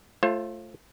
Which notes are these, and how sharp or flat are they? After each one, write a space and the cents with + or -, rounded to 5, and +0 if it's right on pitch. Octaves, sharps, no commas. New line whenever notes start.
A3 +0 F4 -10 C5 +35